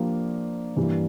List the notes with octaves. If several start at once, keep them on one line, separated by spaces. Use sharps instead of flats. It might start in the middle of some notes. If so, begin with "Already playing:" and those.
Already playing: F3 A#3 D4 G4
G2 E3 G3 A#3